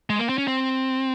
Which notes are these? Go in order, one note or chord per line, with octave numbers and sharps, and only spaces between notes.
G#3
A#3
C4
C#4
C4